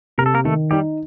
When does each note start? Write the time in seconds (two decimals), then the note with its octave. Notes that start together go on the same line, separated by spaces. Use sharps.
0.18 C3 A#4
0.26 A4
0.34 A#3 A#4
0.45 D#3 A3 A4
0.71 G3 D#4 G4